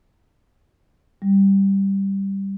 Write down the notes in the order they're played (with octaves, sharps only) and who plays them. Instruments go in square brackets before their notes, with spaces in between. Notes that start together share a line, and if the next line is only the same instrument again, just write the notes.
[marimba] G3